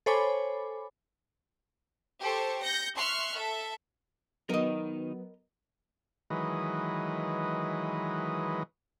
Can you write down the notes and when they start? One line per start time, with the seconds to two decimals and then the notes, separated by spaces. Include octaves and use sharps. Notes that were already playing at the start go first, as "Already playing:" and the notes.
0.06 A4 C5 C#5 G#5 B5 D6
2.20 G4 A4 C5 C#6
2.62 G6 A#6 C#7
2.95 E5 C6 C#6 F6 F#6
3.33 A4 E5
4.49 D#3 F#3 B3 D#4 A#4 D#5
6.30 D#3 E3 F#3 G#3 B4 D#5